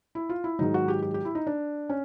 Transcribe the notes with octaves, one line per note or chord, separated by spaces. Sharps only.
E4
F4
E4
G#2 D#3 F#3 D#4
F#4
G4
G4
G4
E4
D#4
D4
C#4